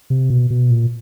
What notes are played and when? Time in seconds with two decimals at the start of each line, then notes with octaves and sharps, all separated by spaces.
0.10 C3
0.30 B2
0.50 B2
0.71 A#2